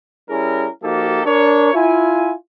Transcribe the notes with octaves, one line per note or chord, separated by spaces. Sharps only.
G3 C#4 E4 G#4 A#4
F3 A#3 D#4 F#4 G4 A4
D4 A#4 C#5
E4 F4 G#5